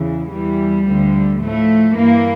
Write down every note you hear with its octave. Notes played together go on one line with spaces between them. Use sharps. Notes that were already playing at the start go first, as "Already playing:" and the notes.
Already playing: E2 C#3 E3
E2 E3 G3
D2 D3 F3
A2 F3 A3
G2 E3 A#3